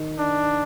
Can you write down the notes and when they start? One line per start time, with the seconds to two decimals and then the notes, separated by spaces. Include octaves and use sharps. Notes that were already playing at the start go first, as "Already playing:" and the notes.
Already playing: D#3 D#4
0.19 D4